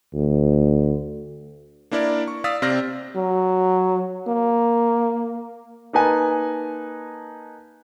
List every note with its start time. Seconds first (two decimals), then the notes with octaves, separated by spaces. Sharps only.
0.14 D2
1.91 A#3 D4 E4 A#4 D5
2.28 C#6
2.44 D5 F5 D#6 E6 A6 B6
2.62 C3 C4 C5 D5 F6 A#6
3.16 F#3
4.28 A#3
5.93 A#3 D#4 B4 G#5 A5